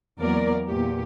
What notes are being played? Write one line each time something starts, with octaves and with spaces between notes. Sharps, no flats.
E2 F#3 A#3 A#4 D5
E2 A#2 G4